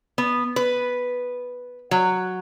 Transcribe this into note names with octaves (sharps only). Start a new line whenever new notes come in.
B3
B4
F#3